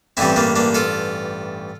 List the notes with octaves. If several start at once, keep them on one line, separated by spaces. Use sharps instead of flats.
A1 G2 E3 G3 C4 E4
A#3 D4
A#3 D4
F4 A4